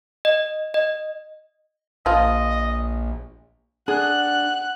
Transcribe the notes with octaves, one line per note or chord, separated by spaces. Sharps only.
D#5
D#5
A#1 F3 F4 D#5
D4 G#4 F#5 F#6